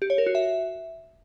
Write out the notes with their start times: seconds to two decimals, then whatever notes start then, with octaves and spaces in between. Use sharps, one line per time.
0.02 G4
0.10 C#5
0.18 A#4
0.26 F#4
0.35 E5